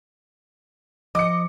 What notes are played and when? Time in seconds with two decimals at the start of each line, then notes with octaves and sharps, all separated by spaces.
1.15 F3 D#5 D6 C#7